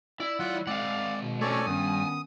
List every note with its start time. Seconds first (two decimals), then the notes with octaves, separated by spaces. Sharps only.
0.20 E4 D5
0.40 F#3 F4 D5 F#5
0.67 G#3 C4 D5 F5 F#5
1.21 B2
1.41 A3 C4 C#4 A4 C#5 D5 G#5
1.66 G2 D#3 B3 C#4 D#6